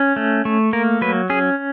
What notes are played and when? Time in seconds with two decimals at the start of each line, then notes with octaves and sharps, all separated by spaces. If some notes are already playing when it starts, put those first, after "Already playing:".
Already playing: C#4
0.16 A3
0.45 A3
0.73 A#3 A#4
1.01 F#3 B4
1.30 C#4 G#4